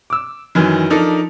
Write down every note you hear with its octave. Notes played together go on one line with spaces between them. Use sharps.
D6 E6
F#2 D#3 E3 F#3
F3 D4 D#4 A4 A#4